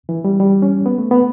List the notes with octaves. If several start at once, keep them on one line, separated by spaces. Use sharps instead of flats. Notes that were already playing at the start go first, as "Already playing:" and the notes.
E3
G3
G3
C#4
B3
A3
B3